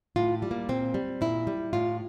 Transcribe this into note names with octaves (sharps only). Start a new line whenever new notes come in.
A2 F4
G3
A#3
A#2 C4
G3
A#2 E4
G3
A2 F4